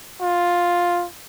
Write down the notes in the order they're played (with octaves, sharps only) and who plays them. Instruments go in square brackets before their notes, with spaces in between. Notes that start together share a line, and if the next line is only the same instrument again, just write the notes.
[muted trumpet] F4